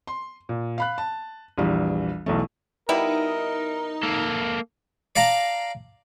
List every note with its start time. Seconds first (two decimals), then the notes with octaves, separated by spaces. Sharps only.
0.07 C6
0.49 A#2
0.78 F5 B5 F#6
0.98 A5
1.58 A#1 E2 E3 G3
2.26 B1 E2 A3
2.89 B2 G3 D#4 E4 A#4
4.03 A#3 A4
5.16 D5 F5 A5 A#5